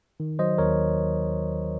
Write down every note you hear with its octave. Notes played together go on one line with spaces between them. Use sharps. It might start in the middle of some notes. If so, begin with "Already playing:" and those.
D#3
F#3 C5 D#5
D#2 A#4 C#5